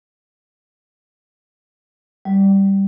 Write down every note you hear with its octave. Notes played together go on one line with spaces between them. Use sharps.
G3